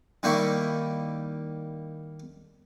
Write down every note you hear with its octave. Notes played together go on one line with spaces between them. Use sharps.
D#3 G3 A#3 E4 C#6